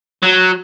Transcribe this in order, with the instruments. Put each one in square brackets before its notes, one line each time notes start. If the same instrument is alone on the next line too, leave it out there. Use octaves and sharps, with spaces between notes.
[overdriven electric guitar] F#3